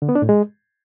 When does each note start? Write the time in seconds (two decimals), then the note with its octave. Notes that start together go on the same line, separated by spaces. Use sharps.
0.02 D3
0.09 B3
0.15 D4
0.22 A2
0.29 G#3